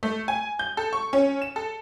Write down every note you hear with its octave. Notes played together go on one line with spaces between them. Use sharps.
A3
G#5
G6
A4
C#6
C#4
E7
A4